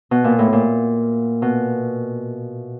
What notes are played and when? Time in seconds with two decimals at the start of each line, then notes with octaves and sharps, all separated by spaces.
0.11 B2
0.24 A#2
0.39 A2
0.53 A#2
1.42 B2